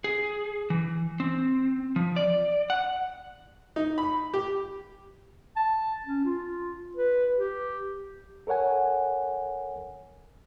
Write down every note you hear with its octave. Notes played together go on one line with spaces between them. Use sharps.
G#4
E3
C4
F3
D5
F#5
D#4
B5
G4
A5
C#4
F4
B4
G4
A4 A#4 C#5 F#5 G#5